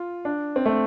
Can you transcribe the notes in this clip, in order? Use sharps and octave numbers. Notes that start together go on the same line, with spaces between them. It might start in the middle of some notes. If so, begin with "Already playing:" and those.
Already playing: F4
D4
C4
A3